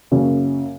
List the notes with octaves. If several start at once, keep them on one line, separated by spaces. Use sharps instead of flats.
F#2 C#3 A#3 C#4